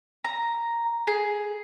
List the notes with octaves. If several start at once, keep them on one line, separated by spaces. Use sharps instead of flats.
A#5
G#4